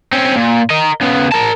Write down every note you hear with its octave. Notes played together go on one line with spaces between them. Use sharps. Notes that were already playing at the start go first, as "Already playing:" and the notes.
C4 C#4
A#2
A#4 D#5
C#3 B3
A#4 A5